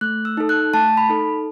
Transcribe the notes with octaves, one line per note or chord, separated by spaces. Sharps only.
A3 F#6
E6
D#4 A4
F#6
A3 A5
B5
D#4 A4